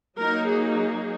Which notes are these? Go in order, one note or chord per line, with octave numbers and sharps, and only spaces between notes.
F#3 A#3 D#4 A#4
G#4
G#4